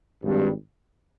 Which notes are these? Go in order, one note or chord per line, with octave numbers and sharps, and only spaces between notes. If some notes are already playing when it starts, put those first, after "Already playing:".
G#1 G2 G3